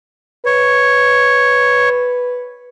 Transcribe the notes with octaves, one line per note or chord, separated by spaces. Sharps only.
B4 C#5